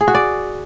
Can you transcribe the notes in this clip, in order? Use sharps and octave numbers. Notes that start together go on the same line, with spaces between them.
G#4
F#4
D5